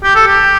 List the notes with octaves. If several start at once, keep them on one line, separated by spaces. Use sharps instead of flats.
G4
A4
G4